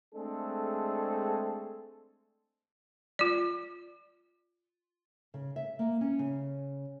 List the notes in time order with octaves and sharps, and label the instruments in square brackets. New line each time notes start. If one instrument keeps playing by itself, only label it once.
[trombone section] G#3 A3 C4 D4 G#4 A4
[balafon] F4 D5
[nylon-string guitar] C#3
E5
A#3
C#4
C#3